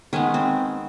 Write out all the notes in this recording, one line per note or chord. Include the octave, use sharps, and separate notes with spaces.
D#3 G#3 B3 C#4
C4